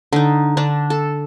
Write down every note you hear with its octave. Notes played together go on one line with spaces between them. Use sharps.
D3 D#4
D3 D4
A4